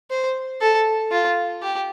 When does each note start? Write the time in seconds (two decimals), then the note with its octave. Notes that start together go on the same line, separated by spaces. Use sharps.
0.10 C5
0.61 A4
1.11 F4
1.62 G4